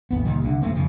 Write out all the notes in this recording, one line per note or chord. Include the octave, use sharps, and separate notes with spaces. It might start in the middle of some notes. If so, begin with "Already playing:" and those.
A1 D#2 B3
C#2 A#2 D#3 G3
C2 D3
F#1 G#2 A3 C4
F2 C#3 F3 G3